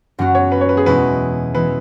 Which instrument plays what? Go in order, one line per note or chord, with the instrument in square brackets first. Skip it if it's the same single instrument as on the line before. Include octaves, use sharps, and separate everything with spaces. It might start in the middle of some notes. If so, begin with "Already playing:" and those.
[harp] F#2 F#3 C#4 F#4
[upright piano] C#5
B4
C#5
B4
G#4
[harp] E2 B2 G#3 C#4 E4 [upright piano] B4
[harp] E3 G#3 E4 [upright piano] B4